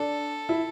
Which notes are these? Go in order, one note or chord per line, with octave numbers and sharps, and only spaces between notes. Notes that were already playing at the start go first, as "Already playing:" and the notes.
Already playing: D4 A4
E4